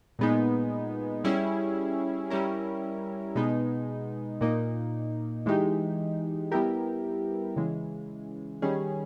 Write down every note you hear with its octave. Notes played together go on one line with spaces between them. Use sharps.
A#2 G#3 B3 D#4
G3 C#4 E4 G#4
G3 C#4 E4 A#4
B2 G#3 B3 D#4
A#2 A#3 D#4
E3 G#3 D#4 G4
G3 B3 E4 G4 A#4
C#3 E3 G#3
D#3 G3 C#4 G#4